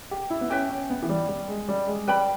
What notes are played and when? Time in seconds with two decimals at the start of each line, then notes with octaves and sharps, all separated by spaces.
0.11 G4
0.30 E4
0.41 B3
0.50 C#4 G4 B4 E5 G5
0.70 C#4
0.90 B3
1.03 E3
1.09 G3
1.29 G3
1.48 G#3
1.69 G3
1.87 G#3
2.07 G3 B4 G5 B5